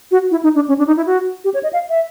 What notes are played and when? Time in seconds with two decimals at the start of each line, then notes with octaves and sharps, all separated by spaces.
0.11 F#4
0.31 E4
0.43 D#4
0.55 D4
0.68 C#4
0.79 D4
0.87 D#4
0.97 E4
1.06 F#4
1.44 G4
1.54 C#5
1.63 D#5
1.73 F5
1.90 E5